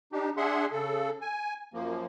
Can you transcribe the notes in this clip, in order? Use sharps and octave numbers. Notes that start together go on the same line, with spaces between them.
D4 D#4 G4
D4 G#4 E5 F#5 C6
C#3 A4
G#5
F#2 F3 A#3